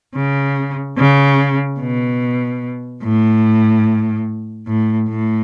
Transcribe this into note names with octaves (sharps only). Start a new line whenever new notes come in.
C#3
C#3
B2
A2
A2
A2